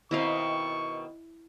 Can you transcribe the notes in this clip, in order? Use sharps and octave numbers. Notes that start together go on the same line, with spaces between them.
B2 D#3 C4 E4 D#5 F5 C#6